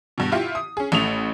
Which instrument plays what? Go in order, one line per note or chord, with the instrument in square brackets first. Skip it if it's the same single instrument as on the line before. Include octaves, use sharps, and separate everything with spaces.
[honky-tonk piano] G2 B2
E4 F4 G4
D#6
C#4 G#4
A1 A3 D#6 F7